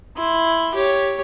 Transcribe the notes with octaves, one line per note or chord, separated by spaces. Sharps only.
E4 C6
G4 C#5